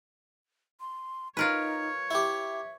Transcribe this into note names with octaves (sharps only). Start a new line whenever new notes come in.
C6
D#4 F4 A#4 B4 C#5
E4 G4 E5